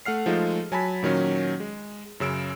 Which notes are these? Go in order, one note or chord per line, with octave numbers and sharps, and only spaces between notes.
A3 F#5 F6 C7
F3 G#3 A3 D#4 F4
F#3 G#5 A5 B5 B6
A#2 D#3 F#3 C#4
G#3
F#2 C#3 E6 D7